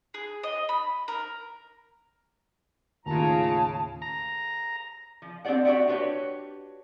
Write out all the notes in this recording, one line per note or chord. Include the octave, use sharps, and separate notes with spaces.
G#4
D#5
B5
A#4
D#2 A2 C#3 F4 A5 A#5
A#5
F3
C4 D4 G4 D5 F#5
F#4 G4 D5 E5 F#5
D4 F#4 G4 B4 C#5